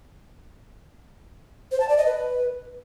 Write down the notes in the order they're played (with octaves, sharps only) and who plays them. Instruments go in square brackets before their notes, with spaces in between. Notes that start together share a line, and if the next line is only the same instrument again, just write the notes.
[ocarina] C5
A5
D5
D#5
B4